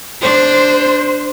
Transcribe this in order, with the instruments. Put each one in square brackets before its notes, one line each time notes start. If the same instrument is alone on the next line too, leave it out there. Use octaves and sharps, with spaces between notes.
[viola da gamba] D4 [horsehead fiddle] C5